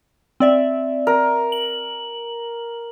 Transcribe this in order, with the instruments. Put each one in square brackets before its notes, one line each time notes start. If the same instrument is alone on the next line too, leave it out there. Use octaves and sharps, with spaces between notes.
[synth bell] C4 D5 E5
[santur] A#4
[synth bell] F#7